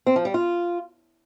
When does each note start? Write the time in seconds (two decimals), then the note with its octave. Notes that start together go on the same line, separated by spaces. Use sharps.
0.06 C4
0.16 F3
0.25 G3
0.34 F4